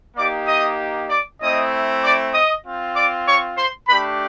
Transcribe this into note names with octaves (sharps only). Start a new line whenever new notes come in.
A#3 D#4 G4 D5 D6
D#5 D#6
D5 D6
A3 C4 E4 D#5 D#6
D5 D6
D#5 D#6
C4 F4
D5 D6
C#5 C#6
C5 C6
A3 D4 G4 B4 B5